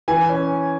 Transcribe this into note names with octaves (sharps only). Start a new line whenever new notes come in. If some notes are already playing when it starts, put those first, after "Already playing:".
E3 G#5
C#4